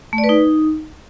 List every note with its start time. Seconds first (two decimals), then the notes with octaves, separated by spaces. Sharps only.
0.13 A3
0.18 D5
0.24 B4
0.29 D#4